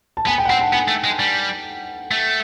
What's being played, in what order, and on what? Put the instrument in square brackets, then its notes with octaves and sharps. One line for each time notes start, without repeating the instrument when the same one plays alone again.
[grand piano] A5
[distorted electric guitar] B3 [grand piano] G#5
[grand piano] G5
F#5
[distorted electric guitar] C4 [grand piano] G5
[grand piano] A5
[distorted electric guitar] B3 [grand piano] G#5
[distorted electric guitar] A3
G#3
G3
A3